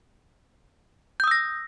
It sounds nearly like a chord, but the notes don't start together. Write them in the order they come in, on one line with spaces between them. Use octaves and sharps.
G6 D#6 E6 A#6